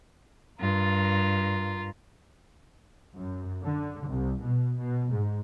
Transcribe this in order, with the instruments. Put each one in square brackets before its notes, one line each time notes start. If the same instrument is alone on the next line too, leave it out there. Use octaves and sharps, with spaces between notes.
[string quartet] G2 [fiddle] F4 A#4
[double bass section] F#2
D3
C2
B2
B2
G#2